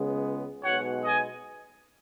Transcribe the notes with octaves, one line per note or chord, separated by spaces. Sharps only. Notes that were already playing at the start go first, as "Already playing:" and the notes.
Already playing: C#2 C#3 G#3 B3
B1 B2 G#3 C#5 F#5
D#5 G#5